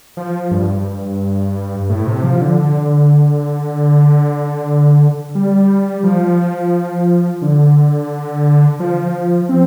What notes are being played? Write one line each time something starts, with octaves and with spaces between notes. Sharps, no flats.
F3
G2
A2
C3
F3
D3
D3
G3
F3
D3
F3
C4